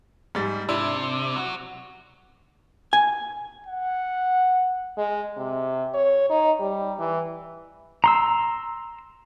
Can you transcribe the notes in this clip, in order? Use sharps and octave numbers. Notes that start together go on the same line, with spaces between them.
G#2 G3 A6
C3 D4 E4
F#3 F#4
G#5
F#5
G#3
C3
C#5
D#4
G3
E3
A#5 C6 E6